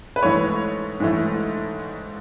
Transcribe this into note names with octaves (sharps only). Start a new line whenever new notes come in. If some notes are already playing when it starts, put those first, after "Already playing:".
B4
G#2 E3 A3 C#5
G#2 E3 A3